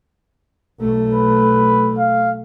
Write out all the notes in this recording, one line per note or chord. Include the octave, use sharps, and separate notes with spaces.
B1 A3
B4
F5